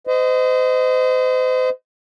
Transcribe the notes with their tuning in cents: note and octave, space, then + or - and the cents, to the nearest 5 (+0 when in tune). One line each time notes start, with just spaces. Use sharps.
C5 -35 D#5 +0